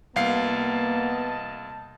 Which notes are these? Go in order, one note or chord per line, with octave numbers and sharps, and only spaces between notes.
C2 A#3 B3 D#5 F5 A5 C7